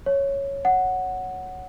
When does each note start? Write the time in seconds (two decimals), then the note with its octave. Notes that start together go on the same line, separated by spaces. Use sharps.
0.06 C#5
0.65 F#5